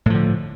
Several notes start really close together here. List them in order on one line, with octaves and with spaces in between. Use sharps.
A2 F3 D3